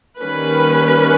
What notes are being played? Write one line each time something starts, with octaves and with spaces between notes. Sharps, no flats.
D#3 G3 A#3 C#4 B4